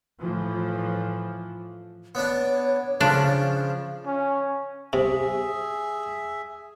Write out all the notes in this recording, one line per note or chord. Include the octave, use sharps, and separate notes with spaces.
A2 E3 F3
B3 D4 C#5
C#3 F3 D4
C#4
C3 G#4 E5